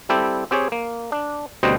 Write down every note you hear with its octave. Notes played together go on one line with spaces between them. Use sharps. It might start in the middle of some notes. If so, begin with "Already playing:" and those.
G3 C4 E4 G4 A4
C4 G4 G#4 C#5
A#3
D4
D2 B2 G3 C4 C5 D#5